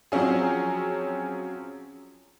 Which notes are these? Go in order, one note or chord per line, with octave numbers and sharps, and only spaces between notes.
F3 F#3 C4 C#4 G#4